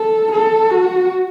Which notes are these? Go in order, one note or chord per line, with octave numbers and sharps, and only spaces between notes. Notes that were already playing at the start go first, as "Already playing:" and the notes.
Already playing: A4
A4
F#4